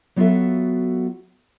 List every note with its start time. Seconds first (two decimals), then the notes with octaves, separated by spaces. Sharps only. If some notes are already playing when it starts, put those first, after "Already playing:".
0.16 F#3 B3 F4 F#4 A4 E5